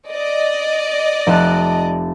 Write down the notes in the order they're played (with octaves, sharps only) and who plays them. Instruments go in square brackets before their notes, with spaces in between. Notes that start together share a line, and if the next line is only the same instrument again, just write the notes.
[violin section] D5 D#5
[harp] F1 A5 F#6